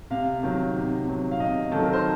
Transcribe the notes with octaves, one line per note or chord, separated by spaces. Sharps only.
C3 F5
D#3 F#3
C3
D#3 F#3
F5
C3 D#5
D#3 F#3 A4
A#4
C5